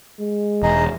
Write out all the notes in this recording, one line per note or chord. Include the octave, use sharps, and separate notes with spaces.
G#3
E1 D#4 G#4 D#5